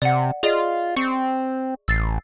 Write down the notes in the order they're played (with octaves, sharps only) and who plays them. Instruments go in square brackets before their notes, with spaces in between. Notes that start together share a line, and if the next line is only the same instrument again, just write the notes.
[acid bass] C3 [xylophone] D5 F#5
[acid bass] F4 [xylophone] G#4 D5 D#5
[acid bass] C4 [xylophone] C#6 C#7
[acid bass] A1 [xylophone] E6 A6 C7